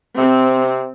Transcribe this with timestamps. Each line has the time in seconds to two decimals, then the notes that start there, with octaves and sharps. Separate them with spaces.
0.18 C3 C4